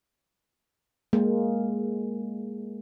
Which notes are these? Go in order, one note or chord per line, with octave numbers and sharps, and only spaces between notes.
G#3 A#3